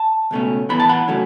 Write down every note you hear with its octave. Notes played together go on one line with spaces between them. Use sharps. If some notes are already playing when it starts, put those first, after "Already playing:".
Already playing: A5
C#2 B2 A3 C#4
A2 E3 B3 B5
A5
F#5 B5
C#3 F#3 A3 C#4